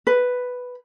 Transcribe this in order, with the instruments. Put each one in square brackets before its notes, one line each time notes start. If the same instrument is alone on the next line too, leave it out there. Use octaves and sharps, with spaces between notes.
[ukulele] B4